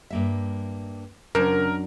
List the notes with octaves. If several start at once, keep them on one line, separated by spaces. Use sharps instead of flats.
G2 A#3 E5
F#2 C#3 D4 A#4